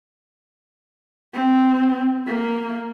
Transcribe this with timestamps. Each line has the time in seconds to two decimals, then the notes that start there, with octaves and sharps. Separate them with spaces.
1.34 C4
2.27 A#3